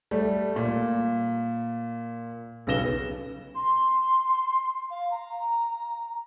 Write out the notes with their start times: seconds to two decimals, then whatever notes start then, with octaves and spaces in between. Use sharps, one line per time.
0.11 G3 A3
0.56 A#2
2.67 B1 C#3 B3 A#6 E7 G7
3.55 C6
4.90 F5
5.10 A#5